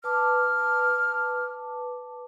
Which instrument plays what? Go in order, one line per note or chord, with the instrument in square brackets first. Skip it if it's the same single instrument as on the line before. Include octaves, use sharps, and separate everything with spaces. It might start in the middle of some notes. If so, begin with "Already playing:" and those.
[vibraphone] B4 A5 D6 [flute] F6